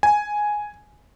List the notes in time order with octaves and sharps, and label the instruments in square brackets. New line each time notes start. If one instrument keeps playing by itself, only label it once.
[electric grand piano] G#5